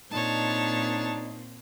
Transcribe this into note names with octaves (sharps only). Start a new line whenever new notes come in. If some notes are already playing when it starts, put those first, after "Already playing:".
A#2 C4 D4 D#4 C#5 A5